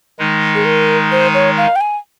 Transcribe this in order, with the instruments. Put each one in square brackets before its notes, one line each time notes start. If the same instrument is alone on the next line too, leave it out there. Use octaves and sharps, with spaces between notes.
[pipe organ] D#3 G#3 D#4
[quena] G#4
A#4
C5
C#5
F5
G5
G#5